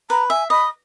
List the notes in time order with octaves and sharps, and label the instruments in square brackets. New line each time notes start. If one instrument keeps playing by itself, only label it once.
[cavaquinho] B4 [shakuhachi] A#5
[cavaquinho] E5 [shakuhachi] G#5
[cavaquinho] D#5 [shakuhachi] B5